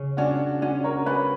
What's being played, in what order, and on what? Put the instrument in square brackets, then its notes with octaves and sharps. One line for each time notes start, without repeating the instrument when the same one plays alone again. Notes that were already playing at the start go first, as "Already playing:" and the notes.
Already playing: [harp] C#3
[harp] C#4 [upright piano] D4 F#4
[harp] C#4 [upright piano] D4 F#4
[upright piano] A#4 C#5
[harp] C#4 [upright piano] B4 D5